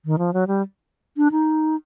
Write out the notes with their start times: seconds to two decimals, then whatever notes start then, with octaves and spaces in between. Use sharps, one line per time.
0.05 D#3
0.18 F3
0.34 F#3
0.47 G3
1.17 D4
1.32 D#4